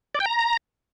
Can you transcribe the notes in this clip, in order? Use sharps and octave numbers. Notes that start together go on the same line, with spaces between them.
D5
G5
A#5